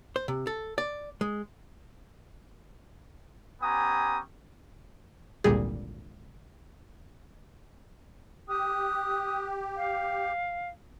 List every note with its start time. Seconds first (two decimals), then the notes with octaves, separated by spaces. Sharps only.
0.16 C5
0.28 C3
0.47 A4
0.78 D5
1.21 G#3
3.62 B3 C#4 G4 G#5 A#5 D#6
5.44 G#1 D2 A#2 G3 G#4
8.49 G4 D#6 F#6
9.76 F5